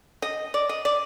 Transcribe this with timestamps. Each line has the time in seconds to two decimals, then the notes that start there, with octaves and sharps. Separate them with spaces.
0.22 D#5
0.54 D5
0.69 D#5
0.85 D5